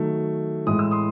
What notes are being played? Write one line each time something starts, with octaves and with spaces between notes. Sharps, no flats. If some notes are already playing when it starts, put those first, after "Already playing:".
Already playing: D#3 F#3 A3
A2 E3 G#3 D#6
E6
C6 D#6